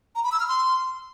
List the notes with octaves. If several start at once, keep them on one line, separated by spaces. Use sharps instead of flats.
A#5
B5
E6
F6
C6